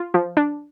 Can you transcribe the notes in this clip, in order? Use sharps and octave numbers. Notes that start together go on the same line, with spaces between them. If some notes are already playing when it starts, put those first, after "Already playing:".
Already playing: F4
F3
D4